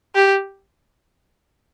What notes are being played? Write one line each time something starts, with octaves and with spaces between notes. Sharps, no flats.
G4